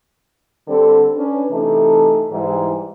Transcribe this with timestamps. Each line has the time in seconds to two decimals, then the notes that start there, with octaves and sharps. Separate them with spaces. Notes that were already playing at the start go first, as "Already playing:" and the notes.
0.67 D3 G3 C4 A4
1.16 C#4 D4 B4
1.51 C3 E3 A3 D#4 A4
2.31 G#2 E3 G3